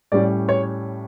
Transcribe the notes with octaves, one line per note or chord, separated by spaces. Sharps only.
A2 G3 C#4 D5
C#5